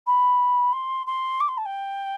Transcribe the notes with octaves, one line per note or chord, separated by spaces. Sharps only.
B5
C6
C6
D6
C6
A5
G5